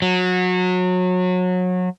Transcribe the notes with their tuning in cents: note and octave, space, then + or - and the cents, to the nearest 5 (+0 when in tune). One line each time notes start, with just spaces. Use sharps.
F#3 -25